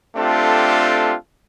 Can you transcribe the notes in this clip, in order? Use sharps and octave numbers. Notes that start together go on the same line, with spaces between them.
A3 C4 D4 F4 G4 A4